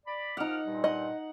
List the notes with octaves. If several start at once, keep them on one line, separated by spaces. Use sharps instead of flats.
D5 B5
F3 D#4 F#5 D6 F6
G2 A#2 G3
D#5 F#5